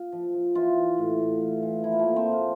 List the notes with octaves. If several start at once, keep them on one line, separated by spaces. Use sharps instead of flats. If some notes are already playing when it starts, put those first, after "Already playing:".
Already playing: F4
F3
F3
E3 F4
E3
A2
A2
E3
E3
F3 E4
A#3
A3
F3
C4
A#2
F4